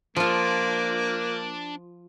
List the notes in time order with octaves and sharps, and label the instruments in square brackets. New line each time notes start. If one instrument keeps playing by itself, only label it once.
[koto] F3 F4 [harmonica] A#3 [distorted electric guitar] D4